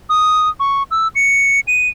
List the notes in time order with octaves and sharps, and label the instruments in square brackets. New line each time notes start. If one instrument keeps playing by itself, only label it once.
[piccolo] D#6
C#6
E6
C#7
D#7